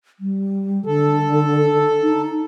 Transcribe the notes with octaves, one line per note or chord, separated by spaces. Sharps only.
G3
D3 A4
D#4